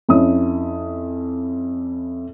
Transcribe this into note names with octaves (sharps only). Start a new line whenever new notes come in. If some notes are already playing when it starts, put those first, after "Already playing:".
F2 C#4 E4 D#6